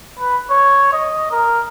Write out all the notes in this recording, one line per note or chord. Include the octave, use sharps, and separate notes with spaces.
B4
C#5
D#5
A#4